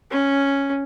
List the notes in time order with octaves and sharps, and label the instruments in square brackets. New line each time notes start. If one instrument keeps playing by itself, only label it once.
[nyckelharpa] C#4